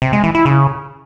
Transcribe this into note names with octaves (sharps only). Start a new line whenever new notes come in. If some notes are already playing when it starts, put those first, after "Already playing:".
C3
G#3
E3
E4
C#3